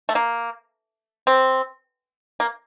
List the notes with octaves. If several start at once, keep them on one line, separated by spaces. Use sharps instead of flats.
A3
A#3
C4
A#3